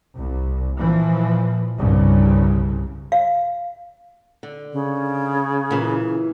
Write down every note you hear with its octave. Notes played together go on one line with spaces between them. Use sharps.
C2
A#2 E3 F3
C2 G2 C#3
F5
D3
C#3
A#2 E3